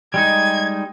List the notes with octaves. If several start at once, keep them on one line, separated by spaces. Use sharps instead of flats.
G3 G#3 D#4 G#6